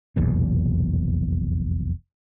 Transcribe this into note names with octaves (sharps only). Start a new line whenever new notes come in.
F1 B1 E2 A#2